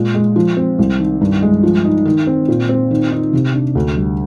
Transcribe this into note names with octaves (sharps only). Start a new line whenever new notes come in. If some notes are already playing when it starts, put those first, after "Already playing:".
Already playing: A#2 G#3
G#3
F3
C4
C2
D#3
G2
G#3
F3
D#4
D#3
C4
A#2
C4
D#3
D#4
C3
D4
D2
G3